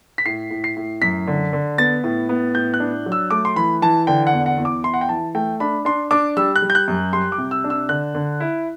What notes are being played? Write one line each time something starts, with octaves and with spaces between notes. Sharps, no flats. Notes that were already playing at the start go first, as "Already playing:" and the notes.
B6
A2 C7
A2
C7
A2
F#2 B6
D3
D3
B3 A6
A2
B3
A2 G6
F#6
D4
F#3
E6
A3 D6
C6
E3 B5
E3 A5
D3 G5
F#5
E2
F#5
E2
D6
E4 C6
F#5
G5
E3 A5
A3 G5
D4 B5
D4 C6
D4 D6
G3 E6
F#6
G3
G6
F#6
F#2
G3 C6
D6
C3
E6
D4
E6
D3 F#6
D3
E4